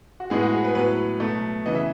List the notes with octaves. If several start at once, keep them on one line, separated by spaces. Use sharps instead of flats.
F#4
A2 G#3 B3 G#4
F#4
G#4
B4
A2 F#3 B3 B4
B2 F#3 A3
C#3 E3 B3 D#5
E5